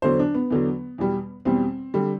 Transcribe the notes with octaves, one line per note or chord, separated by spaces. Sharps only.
E2 D3 F#3 C5
D4
B3
E2 D3 F#3
E2 B2 G3
E2 B2 G3 C4
D3 G3